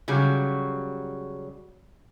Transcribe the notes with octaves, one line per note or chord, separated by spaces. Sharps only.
C#3 F#3 G3